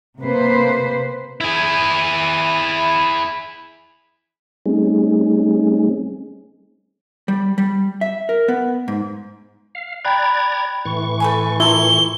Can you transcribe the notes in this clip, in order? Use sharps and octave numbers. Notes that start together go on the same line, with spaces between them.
C3 A#3 B4 C5
E4 G#4
G3 A3 C4 C#4 D#4 G#4
G3
G3
E5
A#4
B3
G#2
F5
D5 G5 A#5 B5 F#6 G#6
A2 E3 C#6
A3 B4 G#5
A#2 E4 A4 G7